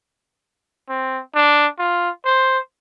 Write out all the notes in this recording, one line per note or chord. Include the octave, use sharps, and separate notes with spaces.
C4
D4
F4
C5